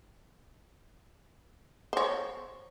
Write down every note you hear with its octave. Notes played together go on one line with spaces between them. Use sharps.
C5 C#5